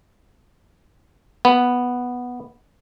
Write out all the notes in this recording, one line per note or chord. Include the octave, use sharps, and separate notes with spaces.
B3